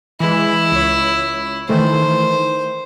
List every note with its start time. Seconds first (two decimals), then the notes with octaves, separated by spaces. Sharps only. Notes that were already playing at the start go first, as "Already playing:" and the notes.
0.20 E3 G#3 E4
0.72 C#2 C#5
1.69 D#3 E3 A3 C5